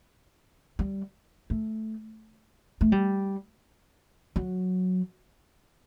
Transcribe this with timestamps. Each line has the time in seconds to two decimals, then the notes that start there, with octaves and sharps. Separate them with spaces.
0.79 G3
1.50 A3
2.81 A3
2.92 G3
4.36 F#3